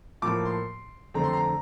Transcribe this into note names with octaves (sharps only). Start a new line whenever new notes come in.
A2 F3 A#3 D6
C6
F2 D3 A3 C4 A#5
C6
A#5